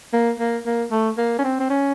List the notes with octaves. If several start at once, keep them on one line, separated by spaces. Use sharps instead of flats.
A#3
A#3
A#3
A3
A#3
C#4
C4
C4
C#4